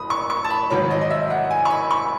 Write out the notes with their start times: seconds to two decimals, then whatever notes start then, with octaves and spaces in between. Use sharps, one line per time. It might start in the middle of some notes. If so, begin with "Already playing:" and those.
Already playing: F#1 B5 D#6
0.10 C#6
0.30 C#6
0.44 A5
0.50 B5
0.70 A1 G#2 D#3 F#3 C#5
0.90 D#5
1.01 D#5
1.10 E5
1.30 F#5
1.50 G#5
1.65 C#6
1.70 B5
1.91 C#6